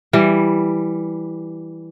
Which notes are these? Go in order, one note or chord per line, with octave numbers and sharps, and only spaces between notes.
E3 G3